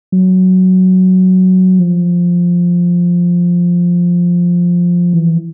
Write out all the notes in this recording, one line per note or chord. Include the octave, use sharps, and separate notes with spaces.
F#3
F3
E3